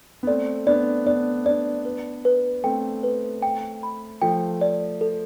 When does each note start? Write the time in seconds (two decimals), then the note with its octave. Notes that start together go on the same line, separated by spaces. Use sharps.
0.23 B3
0.27 A3 C4 D5
0.67 B3 D4 D5
1.06 B3 D4 D5
1.46 B3 D4 D5
1.85 B4
2.25 B4
2.64 A3 C4 G5
3.03 B4
3.42 G5
3.83 B5
4.22 F3 A3 G5
4.61 D5
5.01 A4